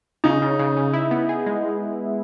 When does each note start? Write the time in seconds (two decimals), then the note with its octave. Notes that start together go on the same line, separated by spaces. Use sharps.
0.24 C#3 D#4
0.42 C#3
0.59 C#3
0.77 C#3
0.93 E4
1.11 B3
1.29 G#4
1.46 G#3